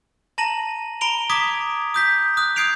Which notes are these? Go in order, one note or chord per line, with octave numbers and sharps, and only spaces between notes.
A5 A#5 A#6 D#7 F#7
A#5 B5 D7 F7 G7
A#5 D6 D#6 G#6 B6 D7
D#6 G6 B6
D#6 F#6
D#6 G6 G#6 C7 D7 F7